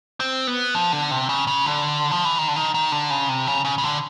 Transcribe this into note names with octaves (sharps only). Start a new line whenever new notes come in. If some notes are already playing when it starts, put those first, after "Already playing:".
C4
B3
F3
D3
C3
C#3
C#3
D3
F3
E3
D#3
D3
D#3
D#3
D3
C#3
C3
C#3
C#3
C#3
D3